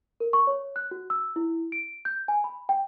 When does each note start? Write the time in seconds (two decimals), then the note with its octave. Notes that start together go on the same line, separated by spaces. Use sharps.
0.20 A#4
0.33 C#6
0.47 C#5
0.76 F#6
0.91 F#4
1.10 E6
1.36 E4
1.72 D7
2.05 G6
2.28 G#5
2.44 B5
2.69 G5